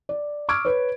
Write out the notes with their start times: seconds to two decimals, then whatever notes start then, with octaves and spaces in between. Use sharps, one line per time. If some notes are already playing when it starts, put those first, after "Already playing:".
0.09 D5
0.49 C#6 D6 E6 F6 G#6 D7
0.65 B4 C#5